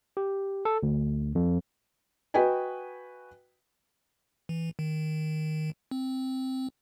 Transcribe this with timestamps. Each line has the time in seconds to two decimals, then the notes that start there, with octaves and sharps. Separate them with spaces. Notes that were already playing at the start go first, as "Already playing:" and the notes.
0.17 G4
0.65 A4
0.83 D2
1.35 F2
2.34 F#4 B4 D#5 G5 G#5
4.49 E3
4.79 D#3
5.91 C4